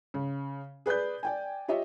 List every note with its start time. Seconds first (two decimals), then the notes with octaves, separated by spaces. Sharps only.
0.14 C#3
0.86 G#4 B4 D5 B5 G6
1.23 D5 G5 G#5
1.68 F4 G4 C#5 D#5 E5